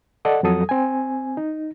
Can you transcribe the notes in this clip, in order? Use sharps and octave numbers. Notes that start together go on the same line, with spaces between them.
A4 D5 D#5 F#5
F2 F#3 A4 D#6
C4 G#5
D#4